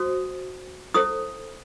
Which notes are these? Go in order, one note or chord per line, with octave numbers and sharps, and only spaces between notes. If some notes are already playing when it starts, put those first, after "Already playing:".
Already playing: F#4 C5 D#6
E4 A4 C5 D#6